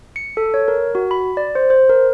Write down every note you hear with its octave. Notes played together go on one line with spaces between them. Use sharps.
C#7
A4
C#5
A#4
F#4
B5
D5
C5
C5
A#4